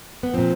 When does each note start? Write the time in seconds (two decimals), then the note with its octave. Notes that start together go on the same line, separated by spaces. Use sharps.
0.23 B3
0.34 A#2 F3 C4